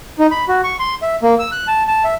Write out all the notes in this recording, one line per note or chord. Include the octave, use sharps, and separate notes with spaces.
D#4
B5
F#4
C#6
C6
E5
A#3
E6
F#6
A5
A5
E5